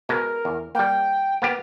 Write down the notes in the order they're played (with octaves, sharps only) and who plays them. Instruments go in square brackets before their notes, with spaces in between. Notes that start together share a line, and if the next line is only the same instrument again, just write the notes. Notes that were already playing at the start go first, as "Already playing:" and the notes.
[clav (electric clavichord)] B2 G#3 [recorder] A#4
[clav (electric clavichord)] E2
[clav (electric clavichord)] G3 A#3 [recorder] G5
[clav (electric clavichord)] A#3 B3 G4